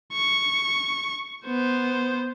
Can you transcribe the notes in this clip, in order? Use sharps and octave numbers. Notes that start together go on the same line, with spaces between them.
C#6
B3 C5